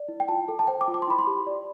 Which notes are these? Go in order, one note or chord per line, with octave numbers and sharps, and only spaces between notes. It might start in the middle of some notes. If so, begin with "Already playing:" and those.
Already playing: D5
E4
G5
F4 A5
A4
A5
C5 G5
D6
F4
D6
C6
E4 B5
C6
G4
D5